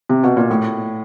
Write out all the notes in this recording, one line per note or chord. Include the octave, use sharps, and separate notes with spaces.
C3
B2
A#2
A2